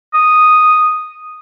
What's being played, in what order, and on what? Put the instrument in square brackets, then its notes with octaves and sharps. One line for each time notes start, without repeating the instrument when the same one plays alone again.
[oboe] D#6